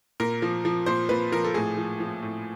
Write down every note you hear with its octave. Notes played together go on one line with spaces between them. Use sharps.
A#2 A#4
F3
F3
A#2 C5
A#2 B4
F3 A#4
A4
A2 G#4
F3
F3
A2